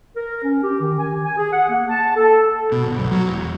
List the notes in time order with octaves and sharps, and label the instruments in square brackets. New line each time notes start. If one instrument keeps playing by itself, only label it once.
[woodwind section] A#4
C#4
G4
D#3
G#5
G#5
G#4
F#5
A#3
A5
A4
[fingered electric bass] B2
G1
B1
F#3
E1